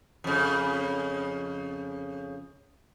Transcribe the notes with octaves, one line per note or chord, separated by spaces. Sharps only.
F2 C#3